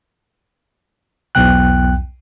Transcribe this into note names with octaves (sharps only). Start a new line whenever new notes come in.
B1 E2 G5 F#6